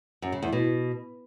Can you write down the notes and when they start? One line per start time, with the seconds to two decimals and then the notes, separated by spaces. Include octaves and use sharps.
0.22 F#2
0.32 C#3
0.42 E2
0.53 B2